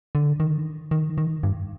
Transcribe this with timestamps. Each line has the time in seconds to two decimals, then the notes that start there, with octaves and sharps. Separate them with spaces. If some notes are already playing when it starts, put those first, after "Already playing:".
0.15 D3
0.40 D#3
0.91 D#3
1.18 D#3
1.43 G2